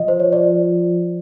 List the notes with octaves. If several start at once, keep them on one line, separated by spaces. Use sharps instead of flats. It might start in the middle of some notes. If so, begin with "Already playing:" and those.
Already playing: F3 D#5
C5
C#5
C5 D5